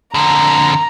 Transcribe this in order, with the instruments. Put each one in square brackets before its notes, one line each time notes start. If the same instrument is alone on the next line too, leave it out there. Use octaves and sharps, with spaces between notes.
[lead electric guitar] F2 D3 [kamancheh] A#5